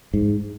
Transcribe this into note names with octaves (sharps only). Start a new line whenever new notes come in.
G#2